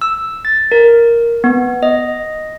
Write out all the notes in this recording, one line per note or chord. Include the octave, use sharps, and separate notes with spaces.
E6
A6
A#4
B3
D#5